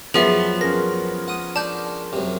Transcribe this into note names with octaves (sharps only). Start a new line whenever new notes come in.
F#2 F3 B3 G#4 B4 E5 A5
C#4 G#4 A#4 A#6
F#5 D#6
D4 A5 G6
F#2 C3